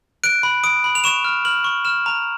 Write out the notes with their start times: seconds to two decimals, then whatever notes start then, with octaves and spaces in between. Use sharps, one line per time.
0.24 F#6 D7
0.43 B5
0.64 D#6 D7
0.84 B5
0.95 F7
1.04 C#6 E7
1.25 F6
1.45 F6 F#7
1.64 C#6
1.85 F6 E7
2.06 A#5